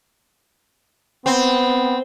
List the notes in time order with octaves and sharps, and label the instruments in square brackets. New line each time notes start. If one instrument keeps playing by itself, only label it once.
[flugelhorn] B3 [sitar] C4